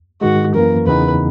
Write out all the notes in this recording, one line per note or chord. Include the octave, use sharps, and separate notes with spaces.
G#2 D#3 G#3 F#4
F#2 E3 A#3 A#4
E2 C#3 E3 B3 D#4 B4